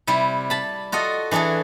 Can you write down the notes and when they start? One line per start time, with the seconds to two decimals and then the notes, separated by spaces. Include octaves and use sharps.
0.07 C3 G3 E4
0.50 A5 B5
0.92 F4 F#4 A4 D#5
1.31 E3 D4 F#4 G#4 A4